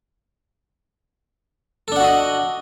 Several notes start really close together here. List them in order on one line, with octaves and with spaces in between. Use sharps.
A4 D4 F#5 F#4 D#5